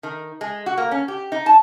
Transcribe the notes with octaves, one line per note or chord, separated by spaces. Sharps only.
D#3
G#3
F#4
A#3
C#4
G4
D#4
A5